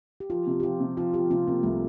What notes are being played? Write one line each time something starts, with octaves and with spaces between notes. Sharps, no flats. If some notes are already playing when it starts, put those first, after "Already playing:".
G4
F3 F4
C3
G4
F3 F4
C3
F3 F4
F3 G4
C3 F4
C3 A#3
C2 A3